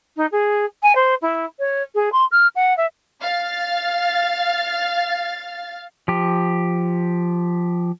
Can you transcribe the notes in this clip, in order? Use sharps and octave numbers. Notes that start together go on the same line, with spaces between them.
D#4
G#4
G#5
C5
E4
C#5
G#4
C6
F6
F#5
E5
F5 A6
F3 G4